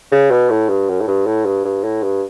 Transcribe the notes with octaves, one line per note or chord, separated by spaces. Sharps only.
C#3
B2
A2
G2
F#2
A2
G2
A2
G2
G2
A2
G2